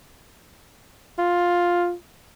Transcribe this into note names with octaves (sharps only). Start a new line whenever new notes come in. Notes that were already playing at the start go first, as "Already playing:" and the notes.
F4